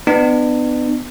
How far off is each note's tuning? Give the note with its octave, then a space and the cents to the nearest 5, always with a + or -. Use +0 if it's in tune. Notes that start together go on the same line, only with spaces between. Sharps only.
B3 +25 D4 +40